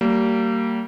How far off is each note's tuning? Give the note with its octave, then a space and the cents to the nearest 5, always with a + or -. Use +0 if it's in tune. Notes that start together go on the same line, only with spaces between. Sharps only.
G3 -30 A#3 -25